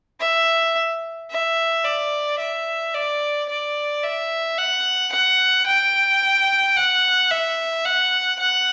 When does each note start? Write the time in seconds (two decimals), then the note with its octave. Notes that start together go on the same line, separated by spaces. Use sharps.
0.21 E5
1.31 E5
1.84 D5
2.39 E5
2.94 D5
3.49 D5
4.03 E5
4.58 F#5
5.12 F#5
5.67 G5
6.76 F#5
7.30 E5
7.85 F#5
8.39 F#5